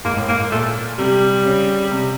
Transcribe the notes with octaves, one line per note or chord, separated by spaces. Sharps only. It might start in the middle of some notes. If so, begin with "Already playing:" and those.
G#2 A#3
A2
G#2 A#3
A#2 A3
C3 G3
C#3
C3